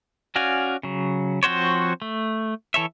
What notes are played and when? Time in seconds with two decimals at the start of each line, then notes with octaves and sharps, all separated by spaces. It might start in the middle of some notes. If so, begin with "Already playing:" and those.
0.35 C#4 F#4 D5 F5 G#5
0.83 C#3 F#3
1.43 F3 C4 F#4 C5 C#5
2.02 A3
2.74 E3 A4 C#5 E5